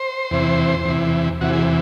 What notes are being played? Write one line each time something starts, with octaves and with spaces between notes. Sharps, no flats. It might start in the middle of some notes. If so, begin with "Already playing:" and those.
Already playing: C5
E2 C3 E3
E2 C3 E3
E2 C3 E3 F#4
G#4